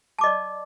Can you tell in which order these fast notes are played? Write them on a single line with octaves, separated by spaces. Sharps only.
A5 D6 D#5 D5